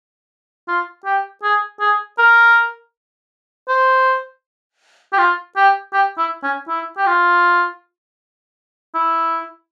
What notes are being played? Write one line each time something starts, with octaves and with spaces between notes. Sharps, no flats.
F4
G4
G#4
G#4
A#4
C5
G4
F4
G4
G4
E4
C#4
E4
G4
F4
E4